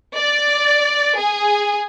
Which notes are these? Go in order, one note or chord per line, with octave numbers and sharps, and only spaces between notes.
D5
G#4